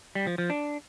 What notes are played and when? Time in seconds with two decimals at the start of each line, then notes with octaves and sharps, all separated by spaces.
0.15 G3
0.27 F3
0.38 F3
0.50 D4